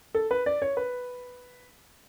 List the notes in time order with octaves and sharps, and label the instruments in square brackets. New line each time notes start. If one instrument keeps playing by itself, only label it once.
[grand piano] A4
B4
D5
C#5
B4